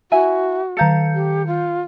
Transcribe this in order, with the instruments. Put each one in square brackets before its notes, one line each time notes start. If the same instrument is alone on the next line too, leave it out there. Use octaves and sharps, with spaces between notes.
[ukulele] E4 E5 G#5 [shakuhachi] F#4
[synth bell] D#3 G6 C#7 [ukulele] A4 F5 A#5
[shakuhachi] G4
F4